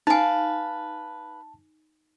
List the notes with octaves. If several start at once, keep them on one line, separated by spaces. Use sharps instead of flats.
D#4 B4 F5 G#5 A5